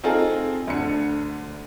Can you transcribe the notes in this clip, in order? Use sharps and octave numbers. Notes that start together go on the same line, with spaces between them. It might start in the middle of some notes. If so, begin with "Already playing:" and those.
C4 D#4 F4 G#4 A4
D2 D3 C#7